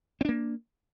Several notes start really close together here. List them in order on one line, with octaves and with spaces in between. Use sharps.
C4 D4 A#3